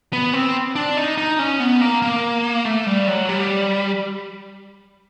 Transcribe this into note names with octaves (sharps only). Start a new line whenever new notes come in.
B3
C4
D4
D#4
D#4
C#4
B3
A#3
A#3
A3
G3
F#3
G3